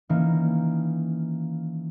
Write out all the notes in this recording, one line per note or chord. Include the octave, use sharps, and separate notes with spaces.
D#3 E3 A#3 C#4